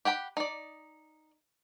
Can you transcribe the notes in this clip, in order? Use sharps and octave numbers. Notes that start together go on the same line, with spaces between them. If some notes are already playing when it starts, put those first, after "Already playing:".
G4 F#5 G5 B5
D#4 D5